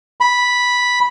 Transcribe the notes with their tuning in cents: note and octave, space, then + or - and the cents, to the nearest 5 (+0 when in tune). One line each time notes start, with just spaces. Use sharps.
B5 -5